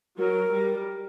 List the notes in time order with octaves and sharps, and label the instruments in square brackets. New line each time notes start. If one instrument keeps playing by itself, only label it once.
[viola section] F#3 [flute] A#4
[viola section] G3